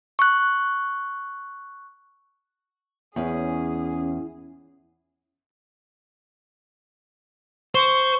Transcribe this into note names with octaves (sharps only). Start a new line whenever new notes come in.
C#6 F#6
E2 C#4 G#4
C5 C#6